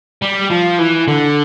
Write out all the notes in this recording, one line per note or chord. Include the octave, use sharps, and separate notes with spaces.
G3
F3
E3
D3